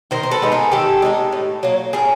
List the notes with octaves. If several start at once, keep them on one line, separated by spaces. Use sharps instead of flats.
D#3 A#4 C5
A#4
A4 B4
G#3 B3 D#4
G#4 A#4
D#3 G4 A4
G#3 B3 D#4
A2
F#3 A#3
A2 G#4 A#4